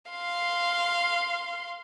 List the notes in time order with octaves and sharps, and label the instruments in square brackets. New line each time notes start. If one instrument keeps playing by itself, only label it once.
[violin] F5 C6